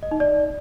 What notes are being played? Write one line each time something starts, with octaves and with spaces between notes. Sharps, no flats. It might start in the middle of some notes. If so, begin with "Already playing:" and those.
D#5
D#4
D5